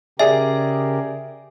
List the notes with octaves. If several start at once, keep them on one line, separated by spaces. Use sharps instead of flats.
C#3 G4 G#4 A#4 D5 E5